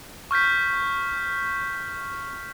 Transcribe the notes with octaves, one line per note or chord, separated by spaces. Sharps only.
C#6 F6 G6 B6